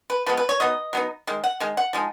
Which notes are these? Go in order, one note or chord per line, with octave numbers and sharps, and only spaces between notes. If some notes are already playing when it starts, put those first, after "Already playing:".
B4
F3 G#3 B3 B4
B4
C#5
F#3 B3 D#4 D#5
F#3 B3 D#4
D#3 G#3
F#5
D#3 G#3
F#5
F3 G#3 D#4